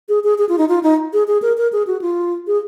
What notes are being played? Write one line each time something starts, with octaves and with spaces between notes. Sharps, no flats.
G#4
G#4
G#4
F4
D#4
F4
D#4
G#4
G#4
A#4
A#4
G#4
F#4
F4
G#4